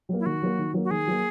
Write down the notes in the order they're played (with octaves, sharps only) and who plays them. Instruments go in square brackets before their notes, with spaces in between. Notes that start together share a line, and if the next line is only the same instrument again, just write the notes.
[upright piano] F#3 A#3
[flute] E4
[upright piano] D#3 [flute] F#4
[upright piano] F#3 A#3
D#3
F#3 A#3
[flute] F#4
[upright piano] D#3 [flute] G#4
[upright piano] F#3 A#3